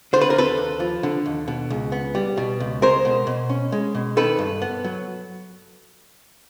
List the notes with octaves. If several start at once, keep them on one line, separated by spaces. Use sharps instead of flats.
D3 C5
B4
A#4
D#2 A4 B4
D#2
F3
D3
D#2
B2
C#2
B3
G3
B2
C#2
G#3 A#4 C5
B2
B2
C#4
G#3
B2
D#3 A4 B4
G2
B3
F#3